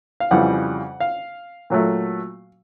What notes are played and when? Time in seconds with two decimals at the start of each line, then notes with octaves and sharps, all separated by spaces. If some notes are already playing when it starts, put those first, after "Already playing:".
0.20 F5
0.31 F2 C#3 E3 G3 F#5
1.00 F5
1.70 A#2 F#3 A3